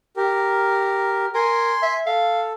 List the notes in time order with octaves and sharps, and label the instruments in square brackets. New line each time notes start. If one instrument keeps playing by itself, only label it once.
[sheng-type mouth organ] G4 A#4
[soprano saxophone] A#4 [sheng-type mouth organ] G#5 C6
[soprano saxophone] E5
[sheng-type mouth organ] A4 [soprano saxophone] F5